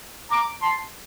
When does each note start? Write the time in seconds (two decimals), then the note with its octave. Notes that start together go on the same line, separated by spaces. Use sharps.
0.31 A#5 D6
0.62 A5 C6